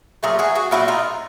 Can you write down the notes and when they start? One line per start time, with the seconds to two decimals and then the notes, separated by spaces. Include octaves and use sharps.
0.23 A#2 F#3 A3 G#4 A#4
0.39 F#4 G#4
0.55 F#4 G#4
0.71 A#2 F#3 A3 E4 F#4
0.88 D#4 F4